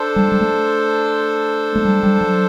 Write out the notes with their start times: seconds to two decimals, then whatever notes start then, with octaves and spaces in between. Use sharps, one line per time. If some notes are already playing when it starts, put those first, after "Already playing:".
Already playing: D4 A4 C5
0.16 G3
0.32 G3
0.41 A3
1.76 A3
1.85 G3
2.03 G3
2.21 F#3